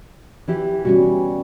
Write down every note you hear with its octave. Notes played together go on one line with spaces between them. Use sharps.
E3 E4 G4
B2 G3 C#4 F#4